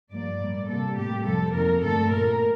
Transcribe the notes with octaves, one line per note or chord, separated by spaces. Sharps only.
G2 F3 A#3 D5
A2 G3 A#3
C3 G3 A#3 A4
A2 G3 A#3 G4
F2 C3 G3 A#3 A4
F2 D#3 A#3 A#4
G2 D3 A3 A4
A#2 A3 A#4